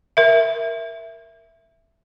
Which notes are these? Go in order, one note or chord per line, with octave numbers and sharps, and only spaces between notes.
A#4 E5